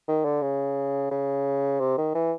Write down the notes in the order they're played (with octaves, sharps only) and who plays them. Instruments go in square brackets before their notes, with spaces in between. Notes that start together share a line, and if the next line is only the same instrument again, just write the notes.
[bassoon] D#3
D3
C#3
C#3
C3
D#3
E3